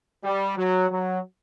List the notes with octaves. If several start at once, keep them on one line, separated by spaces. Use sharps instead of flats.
G3
F#3
F#3